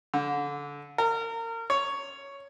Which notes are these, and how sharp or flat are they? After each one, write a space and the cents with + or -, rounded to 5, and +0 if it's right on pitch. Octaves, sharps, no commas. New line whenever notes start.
D3 -25
A#4 -30
C#5 +5